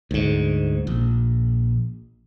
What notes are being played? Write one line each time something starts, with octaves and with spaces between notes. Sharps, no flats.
D2 G#2
A#1